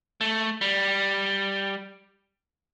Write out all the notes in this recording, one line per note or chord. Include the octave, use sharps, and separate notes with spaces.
A3
G3